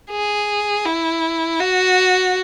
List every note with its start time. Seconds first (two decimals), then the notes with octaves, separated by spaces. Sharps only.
0.11 G#4
0.86 E4
1.60 F#4